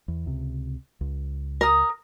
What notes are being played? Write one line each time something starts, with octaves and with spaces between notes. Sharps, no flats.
E2
C#2 C3
C#2
A#4 D#6